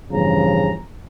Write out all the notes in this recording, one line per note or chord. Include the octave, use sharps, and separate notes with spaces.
A1 E2 G2 C#3 F3 A#5